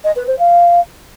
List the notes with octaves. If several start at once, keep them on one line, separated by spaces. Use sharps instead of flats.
D#5
B4
C5
F5